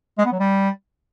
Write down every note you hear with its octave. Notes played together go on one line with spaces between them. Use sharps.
G#3
B3
F#3
G3